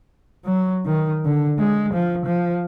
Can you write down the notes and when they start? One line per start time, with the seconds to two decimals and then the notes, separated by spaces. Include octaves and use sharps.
0.45 F#3
0.86 D#3
1.25 D3
1.59 G#3
1.93 F3
2.25 F3